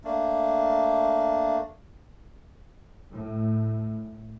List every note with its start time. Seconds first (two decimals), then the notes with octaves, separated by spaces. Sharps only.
0.04 A3 A#3 D4
3.11 A2